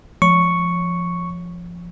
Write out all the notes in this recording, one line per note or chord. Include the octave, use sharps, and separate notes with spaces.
F3 C#6